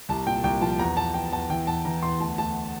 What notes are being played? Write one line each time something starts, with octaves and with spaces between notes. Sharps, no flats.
C2 A5
A#2 G5
C2 G5
F3 A5
E2 A#5
E2 A5
E2 G5
E2 A5
E3 G5
E2 A5
E3 A#5
E2 C6
D2 A5
D2 A5